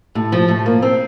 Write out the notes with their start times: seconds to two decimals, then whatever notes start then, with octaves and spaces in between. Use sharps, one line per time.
0.15 A2
0.32 F3
0.49 A2
0.66 A#3
0.82 C4